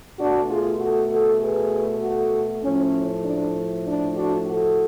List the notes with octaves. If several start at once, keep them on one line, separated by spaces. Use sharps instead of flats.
B2 A3 D4 F#4
F4 G#4
F#4 A4
F#4 A4
G#4 B4
F#4 A4
A2 F3 A3 C#4
D4
D4
D4 F#4
F#4 A4